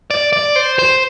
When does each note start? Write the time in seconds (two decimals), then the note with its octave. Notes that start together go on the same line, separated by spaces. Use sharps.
0.11 D5
0.33 D5
0.56 C5
0.79 C5